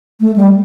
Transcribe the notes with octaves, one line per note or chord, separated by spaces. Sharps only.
A3
G3